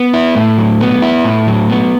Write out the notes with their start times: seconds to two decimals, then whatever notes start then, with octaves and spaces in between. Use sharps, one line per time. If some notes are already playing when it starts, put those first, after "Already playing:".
Already playing: B3
0.14 E4
0.35 A2
0.58 F#3
0.81 B3
1.02 E4
1.25 A2
1.47 F#3
1.70 B3